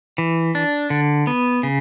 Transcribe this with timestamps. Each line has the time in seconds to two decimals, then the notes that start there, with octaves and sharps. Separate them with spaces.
0.18 E3
0.55 D4
0.90 D3
1.27 B3
1.63 C#3